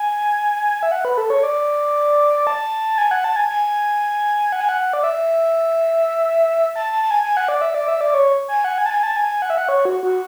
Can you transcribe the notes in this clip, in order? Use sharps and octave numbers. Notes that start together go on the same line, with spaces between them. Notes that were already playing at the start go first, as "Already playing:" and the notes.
Already playing: G#5
E5
F#5
B4
A4
C#5
D5
A5
G#5
F#5
A5
G#5
G#5
F#5
G#5
F#5
D5
E5
A5
A5
A5
G#5
G#5
F#5
D5
E5
D5
E5
D5
C#5
G#5
F#5
G#5
A5
G#5
A5
G#5
F#5
E5
F#5
C#5
F#4
F#4